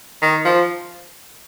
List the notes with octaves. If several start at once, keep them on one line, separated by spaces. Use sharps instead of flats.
D#3
F3